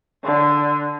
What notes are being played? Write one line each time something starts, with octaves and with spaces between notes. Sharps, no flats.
D3